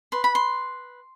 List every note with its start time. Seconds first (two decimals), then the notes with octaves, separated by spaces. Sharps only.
0.12 B4 C6
0.24 B5
0.35 C6